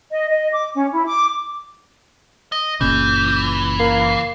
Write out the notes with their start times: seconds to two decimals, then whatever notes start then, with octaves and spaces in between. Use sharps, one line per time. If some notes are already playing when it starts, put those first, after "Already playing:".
0.11 D#5
0.30 D#5
0.53 D6
0.75 C#4
0.92 E4
1.05 D6
2.52 D#5
2.81 F#1 A#2 C#3 E3 G6
3.79 A#3 C7